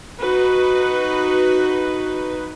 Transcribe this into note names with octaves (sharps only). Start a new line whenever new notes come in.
D#4 F#4 B4